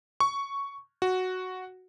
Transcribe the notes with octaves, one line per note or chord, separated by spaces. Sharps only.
C#6
F#4